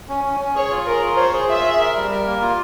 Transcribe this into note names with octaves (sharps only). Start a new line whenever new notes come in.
C#4
C#4
C#4
G#4 C#5
F4
G#4 A#4
F4
C5 C#5
G#4
F4 E5
G#4
A#4
G3
A#4
A#3
F4